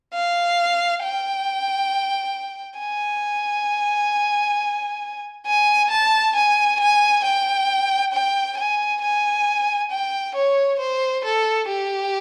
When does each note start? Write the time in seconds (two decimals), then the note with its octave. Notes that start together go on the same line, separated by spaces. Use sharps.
0.14 F5
1.03 G5
2.80 G#5
5.46 G#5
5.91 A5
6.35 G#5
6.80 G#5
7.24 G5
8.13 G5
8.57 G#5
9.01 G#5
9.91 G5
10.35 C#5
10.79 C5
11.24 A4
11.68 G4